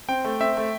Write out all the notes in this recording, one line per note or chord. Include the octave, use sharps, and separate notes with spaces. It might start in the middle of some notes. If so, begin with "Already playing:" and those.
C4 G5
A3
C4 E5
A3